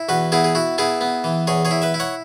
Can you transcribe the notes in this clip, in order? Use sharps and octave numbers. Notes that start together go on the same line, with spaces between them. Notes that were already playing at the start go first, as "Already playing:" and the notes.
Already playing: E4
E2 F#4 B4
B3 E4 G#4
G#4
E4 F#4
B3 E4 G#4
B3
E3
E2 G#4 C#5
G#4 C#5
E4
B4 E5
E4
C#5 F#5